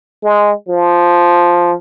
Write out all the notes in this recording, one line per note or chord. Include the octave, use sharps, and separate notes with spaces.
G#3
F3